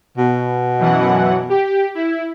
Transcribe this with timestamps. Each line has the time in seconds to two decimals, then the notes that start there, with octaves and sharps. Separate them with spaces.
0.18 B2
0.79 F#2 E3 F#5
1.49 G4
1.95 E4